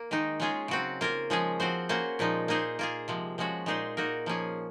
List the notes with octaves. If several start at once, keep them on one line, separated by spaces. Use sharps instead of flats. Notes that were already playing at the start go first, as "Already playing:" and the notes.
Already playing: A#3
D#3 G#3 D#4
G#3 C#4 F4 G#4
C#3 F#3 C4 F#4
A#3 F4 A#4
F3 G#3 C#4 G#4
F3 C4 F#4 C5
A#3 C#4 F#4 C5
A#2 F3 G#3 D#4
A#3 D#4 G#4 C5
A#3 F4 G#4
C3 F3 G#3
F3 G#3 C#4 F#4
A#2 G#3 D#4 G#4 C5
A#3 D#4 F#4 A#4
F3 A#3 C#4 G#4